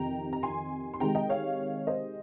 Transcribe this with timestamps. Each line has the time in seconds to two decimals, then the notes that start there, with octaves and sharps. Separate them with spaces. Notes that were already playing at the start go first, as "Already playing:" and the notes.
Already playing: F2 C3 D#3 G5 A#5
0.33 A#5
0.43 G#5 C6
0.93 C6
1.00 C3 D#3 G#3 G5 A#5
1.15 D#5 G5
1.29 C#5 F5
1.87 C5 D#5